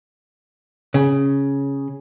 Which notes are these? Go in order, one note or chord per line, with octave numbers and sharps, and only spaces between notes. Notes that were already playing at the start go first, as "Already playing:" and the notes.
C#3